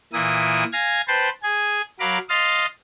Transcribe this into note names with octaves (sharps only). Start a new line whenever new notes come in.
A#2 E3 A#3 E4 D#6
F5 G#5 G#6 A#6
B4 C5 G5 A5 C6
G#4 G#5
F#3 A#4 F5 B5 D6
D#5 F5 C6 F6 A6